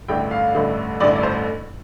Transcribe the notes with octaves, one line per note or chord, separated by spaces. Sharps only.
A1 G2 D3 A3 G5
F5
A1 G2 D3 A3
A1 G2 D3 A3 D5
D5
C5